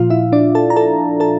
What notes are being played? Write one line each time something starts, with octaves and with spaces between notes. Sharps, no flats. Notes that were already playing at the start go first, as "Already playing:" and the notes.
Already playing: A#2 F3 F4 F5
E4 E5
D4 D5
A4 A5
A#5
A4 A5
A4 A5